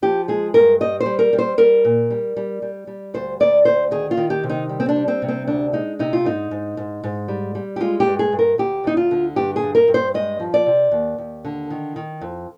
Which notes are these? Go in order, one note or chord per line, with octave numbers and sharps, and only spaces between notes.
F3 G4
G#3 G#4
G2 A#4
G3 D#5
C5
G3
A#4
G3
C5
G3 A#4
A#2
G3
G3
G3
G3
D2 C5
D2 D5
D2 C5
D#3 G#4
F4
D#3
G4
C3
D#4
G3
C4
D4
G3
C4
C3
C4
D2 D4
G#3 D#4
C3 D#4
F4
G#2 D#4
G#2
G#2
G#2
G3
G3
G4
G#3 F4
G4
G2
G#4
G2
A#4
D2 G4
D2 D#4
F4
D3
G2 G4
G#4
G2
A#4
G2
C5
G#3 D#5
F3
D5
C3
D#2
D#2
D3
D#3
D#3
F2